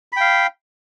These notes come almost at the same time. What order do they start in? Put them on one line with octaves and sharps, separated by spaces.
B5 G5 F5